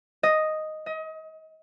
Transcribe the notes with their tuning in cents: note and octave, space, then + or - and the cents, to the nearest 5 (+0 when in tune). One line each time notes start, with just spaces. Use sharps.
D#5 +0
D#5 +30